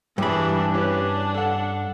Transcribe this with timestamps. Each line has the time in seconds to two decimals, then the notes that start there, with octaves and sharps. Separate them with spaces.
0.18 G2 E3 G3 D4 G#4 B5
0.74 C#4 D4 G4 B4
1.35 A4 F#5